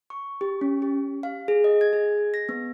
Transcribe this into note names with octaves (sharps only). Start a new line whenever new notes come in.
C#6
G4
C#4
G4
F5
G#4
D#5
G#6
G#4
A#6
B3